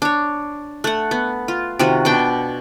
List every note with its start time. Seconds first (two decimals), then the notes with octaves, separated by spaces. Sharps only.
0.02 D4 C#5
0.84 A3 F#5
1.11 B3
1.48 F4
1.79 C3 D#3 F4 F#4
2.05 B2 D4 G5